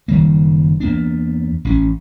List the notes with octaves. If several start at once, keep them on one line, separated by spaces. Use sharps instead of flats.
F#1 D#3 G3 A#3
E2 A#3 B3 D4
A1 C#4